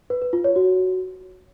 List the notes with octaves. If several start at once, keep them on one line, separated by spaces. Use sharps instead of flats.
B4
B4
F4
C#5
F#4